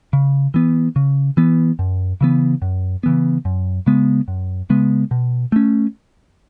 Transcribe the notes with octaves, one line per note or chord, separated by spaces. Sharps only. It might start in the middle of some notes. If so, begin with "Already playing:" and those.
C#3
E3 B3
C#3
E3 B3
F#2
C#3 E3 B3
F#2
C#3 E3 B3
F#2
C#3 G#3 B3
F#2
C#3 G#3 B3
B2
A3 C#4